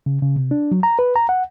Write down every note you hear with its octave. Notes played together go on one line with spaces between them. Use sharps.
C#3
C#3
C3
D4
F#3
A#5
B4
A#5
F#5